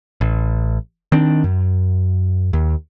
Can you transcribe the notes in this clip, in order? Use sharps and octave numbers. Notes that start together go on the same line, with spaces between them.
A1
D#3 C4 D4
F#2
D#2